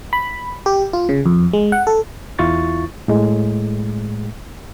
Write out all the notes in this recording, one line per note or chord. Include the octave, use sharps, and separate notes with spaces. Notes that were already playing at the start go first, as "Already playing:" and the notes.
B5
G4
F4
C#3
F2
G#3
F#5
A4
E2 E4 F4 C#6 A6
A2 G#3